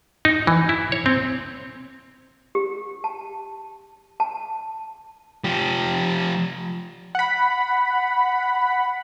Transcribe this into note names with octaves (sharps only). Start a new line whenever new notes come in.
D#4
E3
E4
C#5
C4
G4
A5
A5
F3 G4
F#5 B5